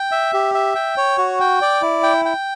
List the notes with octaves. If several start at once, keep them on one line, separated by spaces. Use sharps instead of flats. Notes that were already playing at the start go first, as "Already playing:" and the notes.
Already playing: G5
E5
G4
E5
G5
C#5
F#4
G5
D5
E4
G5
G5